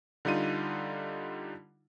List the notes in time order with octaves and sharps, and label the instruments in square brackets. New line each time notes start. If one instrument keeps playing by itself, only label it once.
[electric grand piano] D3 G3 D#4 F4 D#7